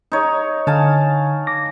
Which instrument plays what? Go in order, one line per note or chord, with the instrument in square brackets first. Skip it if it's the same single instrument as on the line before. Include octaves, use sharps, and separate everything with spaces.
[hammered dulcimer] D#4 C#5
[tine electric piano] D3 [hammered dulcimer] F5 G#5 A5
[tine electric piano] D6 A#6